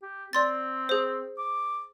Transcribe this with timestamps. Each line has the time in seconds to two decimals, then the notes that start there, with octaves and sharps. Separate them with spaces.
0.03 G4
0.33 C4 D5 C6 A6
0.89 G#4 C5
1.39 D6